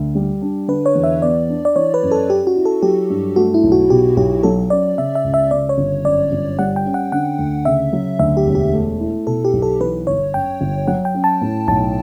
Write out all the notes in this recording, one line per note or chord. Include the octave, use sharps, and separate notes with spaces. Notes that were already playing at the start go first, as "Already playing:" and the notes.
Already playing: D2
G3
D4
D3 B4
C#5
E2
E5
B3 D5
D4
D5
E3 C#5
B4
F#2
A4
C#4 G4
F#4
E4
A4
F#3 G4
G2
A3 F#4
E4
B1
F#4
B2 G4
B1 G4
F#3 A4
C#4 D5
C#3 E5
E5
C#2
E5
C#3 D5
C#5
G1
F#2 D5
G1
G3 F#5
G5
C#4
F#5
D3 F#5
D2
C#3 E5
F#3
D2 E5
G4
E1
G4
A3
E4
B2 A4
G4
B1
A4
E3 B4
G1 C#5
F#2 G5
G1
F#3 F#5
G5
C#4
A5
A2
B1 A5